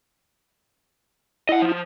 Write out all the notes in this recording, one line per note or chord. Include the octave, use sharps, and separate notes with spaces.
E4 D#5 F#5
F3